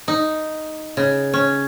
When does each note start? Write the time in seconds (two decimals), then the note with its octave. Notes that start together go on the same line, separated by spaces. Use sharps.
0.08 D#4
0.97 C#3
1.34 C#4